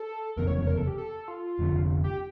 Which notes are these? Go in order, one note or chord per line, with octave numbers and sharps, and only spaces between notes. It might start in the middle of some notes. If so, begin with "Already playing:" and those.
Already playing: A4
F1 E2 C#3 A#4
C#5
C#5
A#4
A4
G4
A4
F4
F1 F2 D3 F3
G4